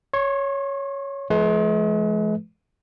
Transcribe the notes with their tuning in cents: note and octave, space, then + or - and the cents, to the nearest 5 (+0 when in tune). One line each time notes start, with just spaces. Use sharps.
C#5 +0 C6 +45
F3 -30 G#3 +45 B4 +0